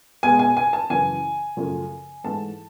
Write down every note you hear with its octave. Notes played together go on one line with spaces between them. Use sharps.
B2 G#3 G#5
G#5
G#5
A5
F#2 C#3 E3 G#5
F#2 C#3 F3 A3
G#2 E3 A3 A5